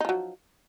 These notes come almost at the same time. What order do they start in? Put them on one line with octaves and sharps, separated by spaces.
D#4 F3 F#3